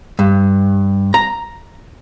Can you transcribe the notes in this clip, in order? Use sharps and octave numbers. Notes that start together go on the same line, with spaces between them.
G2
A#5